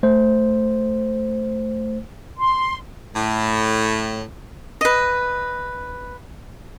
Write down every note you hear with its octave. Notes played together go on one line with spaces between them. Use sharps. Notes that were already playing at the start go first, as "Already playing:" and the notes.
A3 C5
C6
A2
B4 D#5